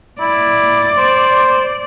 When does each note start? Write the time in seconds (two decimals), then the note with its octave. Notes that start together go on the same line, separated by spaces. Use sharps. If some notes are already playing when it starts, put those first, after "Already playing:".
0.20 E4 D5
0.98 C5